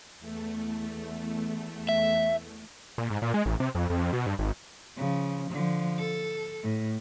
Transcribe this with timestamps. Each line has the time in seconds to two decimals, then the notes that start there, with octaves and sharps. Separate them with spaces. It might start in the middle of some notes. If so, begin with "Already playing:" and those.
0.19 E2 A3
1.89 E5
2.98 A#2
3.10 G#2
3.22 A#2
3.34 G#3
3.46 A1
3.60 C3
3.75 F2
3.90 F2
4.13 B2
4.26 G2
4.39 G#1
4.97 C#3 F3
5.50 D3 F3
5.99 A4
6.63 A2